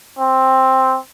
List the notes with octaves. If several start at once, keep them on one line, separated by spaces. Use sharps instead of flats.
C4